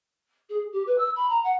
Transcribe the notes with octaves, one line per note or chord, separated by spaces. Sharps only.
G#4
G4
B4
E6
B5
A#5
F#5